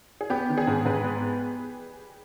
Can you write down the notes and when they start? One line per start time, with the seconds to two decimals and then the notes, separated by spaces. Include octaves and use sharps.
0.21 G#4
0.30 B3 G4
0.49 D#3
0.58 G#4
0.67 G#2
0.85 G#2 B4
1.04 B3